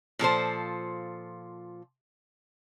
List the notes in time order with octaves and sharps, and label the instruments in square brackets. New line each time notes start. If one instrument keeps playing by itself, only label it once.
[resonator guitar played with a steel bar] A#2 F3 A4 C5